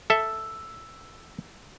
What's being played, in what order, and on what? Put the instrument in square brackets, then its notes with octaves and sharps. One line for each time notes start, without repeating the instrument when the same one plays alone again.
[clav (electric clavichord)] A4 E5 [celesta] E6